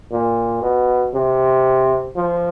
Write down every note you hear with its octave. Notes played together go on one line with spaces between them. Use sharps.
A#2
B2
C3
F3